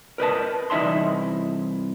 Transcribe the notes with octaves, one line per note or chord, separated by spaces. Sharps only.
A#4 B4 D#5 A5
C2 E3 D#4 E5 A5 C6